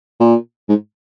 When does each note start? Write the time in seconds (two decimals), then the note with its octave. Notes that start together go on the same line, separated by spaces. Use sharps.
0.20 A#2
0.69 G#2